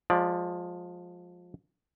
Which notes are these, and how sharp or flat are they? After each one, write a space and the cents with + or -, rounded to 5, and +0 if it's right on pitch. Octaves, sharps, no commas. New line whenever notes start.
F3 +20 G#3 +0 D5 +0